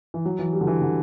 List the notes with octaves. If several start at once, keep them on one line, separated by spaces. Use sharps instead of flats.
E3
F#3
E3
G3
D3
E3
D3